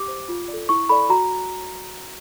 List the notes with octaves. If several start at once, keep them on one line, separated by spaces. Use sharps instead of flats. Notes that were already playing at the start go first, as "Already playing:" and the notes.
Already playing: G4 D6
C5
F4
D5
A4
E4 C#6
A4 D5 B5
F#4 A#5